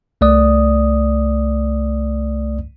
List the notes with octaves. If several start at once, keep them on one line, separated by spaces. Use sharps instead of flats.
C2 A3 D5 D#6